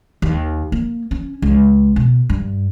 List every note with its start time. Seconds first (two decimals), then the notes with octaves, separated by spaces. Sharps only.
0.22 D#2
0.72 A#3
1.11 C#4
1.42 C#2
1.96 B2
2.30 G2